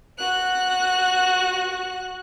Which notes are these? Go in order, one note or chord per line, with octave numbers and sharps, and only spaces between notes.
F#4 F#6